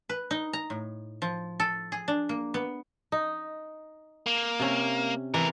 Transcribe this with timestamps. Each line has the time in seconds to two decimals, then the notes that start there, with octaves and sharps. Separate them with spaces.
0.09 B4
0.31 D#4
0.53 A#5
0.70 A2
1.22 F3
1.60 A4
1.92 G#4
2.08 D4
2.29 A#3
2.54 B3
3.12 D#4
4.26 A#3
4.60 C3 C#4
5.34 E2 E3 A#4